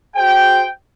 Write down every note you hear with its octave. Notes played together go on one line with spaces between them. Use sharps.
F#4 G#4 C5 G5